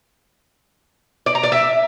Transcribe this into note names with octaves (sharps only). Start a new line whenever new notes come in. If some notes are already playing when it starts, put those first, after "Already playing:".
D5
A#5
D5
E5